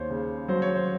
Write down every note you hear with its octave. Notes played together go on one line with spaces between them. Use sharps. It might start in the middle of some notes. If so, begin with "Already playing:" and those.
Already playing: D#2 C5 C#5
C#3
F#3 C5
C#5
C5